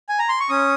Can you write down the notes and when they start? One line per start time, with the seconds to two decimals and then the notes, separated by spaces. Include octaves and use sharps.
0.09 G#5
0.19 A#5
0.29 C6
0.40 C#6
0.49 C#4 D#6